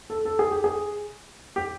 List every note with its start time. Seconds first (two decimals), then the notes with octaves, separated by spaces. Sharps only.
0.10 A4
0.25 A4
0.39 G#4
0.51 G4
0.64 G#4
1.56 G4